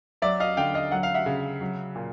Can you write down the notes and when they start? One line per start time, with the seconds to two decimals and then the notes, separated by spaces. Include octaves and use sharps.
0.22 F#3 D5 E5
0.40 D#5 F5
0.57 D3 F5 G5
0.74 D#5 F5
0.91 F#3 F#5
1.03 F5
1.14 E5 F#5
1.26 C#3
1.61 F#3
1.95 A#2